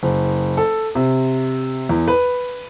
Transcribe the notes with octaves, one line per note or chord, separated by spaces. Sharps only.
F#1
A4
C3
E2
B4